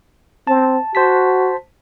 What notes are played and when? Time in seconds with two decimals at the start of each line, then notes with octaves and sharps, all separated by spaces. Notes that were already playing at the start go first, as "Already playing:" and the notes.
0.47 C4 A5
0.95 F#4 C5 A5 B6